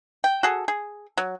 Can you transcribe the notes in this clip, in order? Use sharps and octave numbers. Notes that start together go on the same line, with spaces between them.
G5
F#4 G#4 A4
G#4
F#3